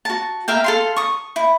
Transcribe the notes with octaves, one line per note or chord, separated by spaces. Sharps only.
F#4 A5
A#4 E5 F5 G5
A4 F5 C6
C#6 D#6
E4